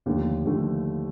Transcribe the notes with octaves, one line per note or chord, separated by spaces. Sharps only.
D#2 D3 F3 A3
D#2 D3 F3 A3